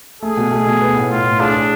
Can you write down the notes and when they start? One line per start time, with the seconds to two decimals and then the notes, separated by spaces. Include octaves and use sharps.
0.22 A3 G#4
0.37 B2
0.51 A3
0.66 B2
0.81 B3
0.96 A2
1.10 A2 F4
1.26 A2
1.40 D4 G#4
1.54 G#4